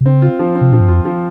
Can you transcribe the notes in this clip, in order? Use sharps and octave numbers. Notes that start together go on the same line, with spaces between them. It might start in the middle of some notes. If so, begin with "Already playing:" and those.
C3
C#3 C4
F4
F3
C4
C3
A#2 F3
G2
F2 F4
F3